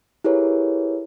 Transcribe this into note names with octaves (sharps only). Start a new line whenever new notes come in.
E4 G4 G#4 A#4 B4 C#5